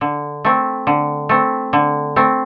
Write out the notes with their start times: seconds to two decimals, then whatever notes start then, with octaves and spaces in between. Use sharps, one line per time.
0.01 D3
0.45 A3 C4
0.87 D3
1.29 A3 C4
1.73 D3
2.16 A3 C4